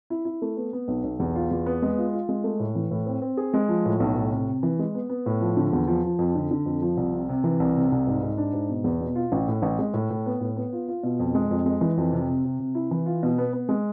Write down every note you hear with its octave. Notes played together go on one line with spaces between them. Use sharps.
E4
E4
A3
B3
B3
B1
B1
E2
F4
E2
B3
G#3
F4
F4
G#3
A3
A2
E3
A2
C4
C4
G#4
G#3
F3
A2
B1
A2
C3
C3
E3
G#3
B3
B3
A2
F3
D3
E2
F3
F3
F2
D3
D3
F2
F3
C2
C3
C3
E3
C2
C3
C2
G#2
G#2
D4
G#2
B2
E2
B2
F4
A1
A2
A1
G#3
A2
A2
B3
A2
B3
F4
F4
B2
F2
G#3
F2
G#3
E3
F2
C3
C3
C3
C3
E4
E3
F4
B2
B3
B3
G#3